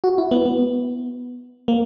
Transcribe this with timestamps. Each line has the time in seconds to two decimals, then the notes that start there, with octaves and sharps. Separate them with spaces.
0.04 F#4
0.18 E4
0.31 B3
0.46 B3
1.68 A#3